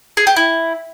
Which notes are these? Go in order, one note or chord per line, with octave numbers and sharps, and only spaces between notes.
G#4
G4
E4